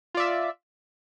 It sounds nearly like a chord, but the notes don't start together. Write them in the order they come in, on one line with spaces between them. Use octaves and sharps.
F4 D5 E5